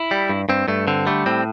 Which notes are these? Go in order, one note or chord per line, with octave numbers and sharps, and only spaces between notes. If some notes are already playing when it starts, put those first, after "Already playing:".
Already playing: E4
G3
G2
G2 C4
G2 A3
D3 C4
G3 A3
A2 C4